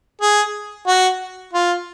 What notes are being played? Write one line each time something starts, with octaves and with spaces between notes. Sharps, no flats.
G#4
F#4
F4